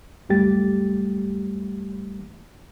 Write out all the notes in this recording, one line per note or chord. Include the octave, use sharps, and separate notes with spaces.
C#2 F#2 G3 A3 G4 A6